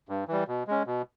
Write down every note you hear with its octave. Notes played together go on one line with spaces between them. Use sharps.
G2
E3 G3
B2
G#3 C#4
B2